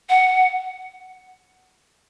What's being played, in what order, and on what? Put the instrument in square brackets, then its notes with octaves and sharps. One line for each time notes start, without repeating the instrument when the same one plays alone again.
[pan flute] F#5